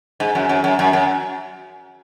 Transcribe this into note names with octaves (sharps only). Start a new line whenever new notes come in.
G#2
F#2
F#2
F#2
F#2
F#2